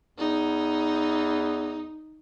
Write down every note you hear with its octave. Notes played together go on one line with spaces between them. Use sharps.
E2 D#4